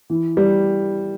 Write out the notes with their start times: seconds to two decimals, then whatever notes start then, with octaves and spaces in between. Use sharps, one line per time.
0.10 E3
0.37 G3